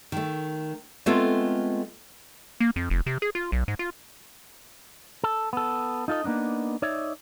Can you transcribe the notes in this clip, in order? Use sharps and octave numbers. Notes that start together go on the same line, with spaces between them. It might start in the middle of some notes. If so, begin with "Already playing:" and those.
D#3 A3
G#3 A3 B3 C4 F4 A4
A#3
F2
F1
C3
G#4
F4
B1
G#2
F4
A4
B3 A4
D#4 F4 A4 D#5
A#3 B3 D4 D#4
D#4 C#5 D5 E5